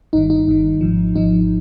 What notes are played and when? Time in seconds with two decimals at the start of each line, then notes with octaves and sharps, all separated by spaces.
0.13 G1 G2 D#3 D#4
0.30 D#4
0.48 G1 G2 D#3
0.81 G#1 G#2 F3
1.14 G#1 G#2 F3 D#4